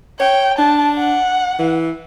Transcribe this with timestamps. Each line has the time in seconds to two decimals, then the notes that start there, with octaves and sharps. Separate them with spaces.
0.20 C#5 G5
0.58 D4 A5
0.98 F#5
1.59 E3